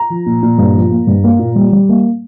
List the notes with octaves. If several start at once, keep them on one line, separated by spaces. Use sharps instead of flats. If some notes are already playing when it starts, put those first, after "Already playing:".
Already playing: A#5
F3
A#2
A#2
G2
F3
A#3
G2
A#3
A#2
G3
G3
A#3